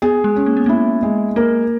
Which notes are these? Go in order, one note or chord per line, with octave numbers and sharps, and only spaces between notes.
B3 G#4
G#3
C#4
A#3
B3
A#3 E4
G#3
A#3 A#4